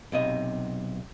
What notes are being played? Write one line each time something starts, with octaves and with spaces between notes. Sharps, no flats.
B1 C3 D#5